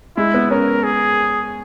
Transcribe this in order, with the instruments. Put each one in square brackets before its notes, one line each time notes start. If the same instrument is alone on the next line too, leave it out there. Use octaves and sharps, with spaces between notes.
[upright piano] G#3 [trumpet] E4
[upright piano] B3
[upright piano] C#4 [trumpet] A#4
[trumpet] G#4